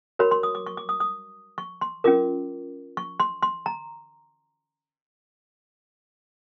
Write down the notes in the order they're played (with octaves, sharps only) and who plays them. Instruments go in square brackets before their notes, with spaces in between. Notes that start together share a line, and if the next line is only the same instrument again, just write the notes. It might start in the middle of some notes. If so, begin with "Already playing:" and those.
[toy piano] F#4 A#4 C#5 B5
C6
D#6
D6
C#6
D6
D#6
D#6
C#6
C6
C#4 F4 A#4 D6
C#6
C6
C6
A#5